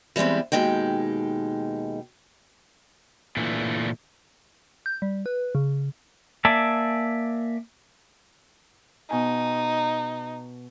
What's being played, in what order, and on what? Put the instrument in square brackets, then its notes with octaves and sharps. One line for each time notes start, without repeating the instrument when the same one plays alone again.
[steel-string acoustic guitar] E3 G3 G#3 B3 C4
D#2 B2 G#3 D#4 G5
[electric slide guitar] A#2 D3 E3 A3
[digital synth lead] G6
G3
B4
C#3
[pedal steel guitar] A#3 D5 E5 G#5 A5
[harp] B2 G#5 [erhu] D#4